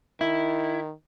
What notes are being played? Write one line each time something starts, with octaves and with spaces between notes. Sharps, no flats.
D#3 E4